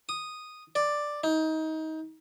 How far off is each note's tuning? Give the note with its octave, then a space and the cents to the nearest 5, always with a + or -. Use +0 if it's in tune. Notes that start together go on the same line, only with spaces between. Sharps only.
D#6 -5
D5 +5
D#4 +25